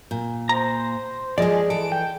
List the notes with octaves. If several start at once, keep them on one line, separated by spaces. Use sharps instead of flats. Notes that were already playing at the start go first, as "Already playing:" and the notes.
A#2
C5 A#5
F3 G#3 G#4 D5 D#5
E3 A4 D7
G5